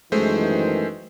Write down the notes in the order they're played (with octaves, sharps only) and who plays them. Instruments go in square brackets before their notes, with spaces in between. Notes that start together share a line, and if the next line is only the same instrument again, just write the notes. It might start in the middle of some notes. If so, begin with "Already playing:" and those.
[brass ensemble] F#2 D#3 E3 [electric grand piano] G#3 A3 C5